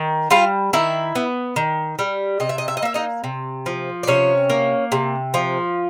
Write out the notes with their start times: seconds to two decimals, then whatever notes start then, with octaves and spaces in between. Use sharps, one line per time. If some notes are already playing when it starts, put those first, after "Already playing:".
Already playing: D#3
0.30 G3 F4 F5
0.73 D#3 E4 E5
1.15 B3
1.56 D#3
1.99 G3
2.40 C3 D#5
2.49 E5
2.58 D#5
2.68 E5
2.77 D#5
2.82 A#3 E5
2.94 D#4 D#5
3.24 C3
3.66 F3
4.03 D5
4.07 C3 C#4 C#5
4.50 A#3
4.92 C3
5.34 F3